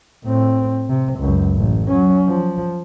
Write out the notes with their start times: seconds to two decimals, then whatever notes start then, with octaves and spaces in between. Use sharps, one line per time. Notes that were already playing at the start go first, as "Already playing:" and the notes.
0.25 A2 C4
0.89 C3
1.20 C#2 F#2
1.55 A1
1.88 F#3 C#4
2.28 F3